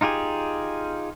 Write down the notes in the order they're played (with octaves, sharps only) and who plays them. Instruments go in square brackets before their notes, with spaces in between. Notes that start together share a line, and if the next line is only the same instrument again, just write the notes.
[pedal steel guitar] D#4 F4 G4 G#4